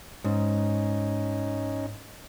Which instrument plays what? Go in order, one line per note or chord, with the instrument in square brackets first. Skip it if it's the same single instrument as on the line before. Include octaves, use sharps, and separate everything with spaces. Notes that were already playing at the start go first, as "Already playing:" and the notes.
[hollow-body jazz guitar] G#2 [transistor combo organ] C#4 D#4